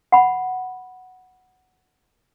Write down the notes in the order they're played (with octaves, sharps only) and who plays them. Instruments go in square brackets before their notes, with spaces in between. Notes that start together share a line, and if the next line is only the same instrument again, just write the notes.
[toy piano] F#5 B5